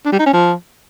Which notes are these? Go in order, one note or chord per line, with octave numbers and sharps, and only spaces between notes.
D4
G3
D#4
C#4
F3